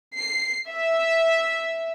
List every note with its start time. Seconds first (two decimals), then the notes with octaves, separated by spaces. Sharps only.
0.18 C7
0.70 E5